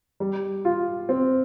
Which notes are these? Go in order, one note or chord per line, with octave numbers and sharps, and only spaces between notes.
G3
F4
C4